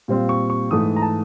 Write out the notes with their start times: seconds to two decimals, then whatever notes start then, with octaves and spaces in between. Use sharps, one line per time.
0.08 A#2 G3 C4 F4
0.29 C#6
0.50 C#6
0.70 G#2 E3 A3 D#6
0.96 A#5
1.02 A5